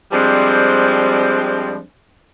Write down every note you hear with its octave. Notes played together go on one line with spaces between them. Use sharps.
F3 G3 G#3 C4 D4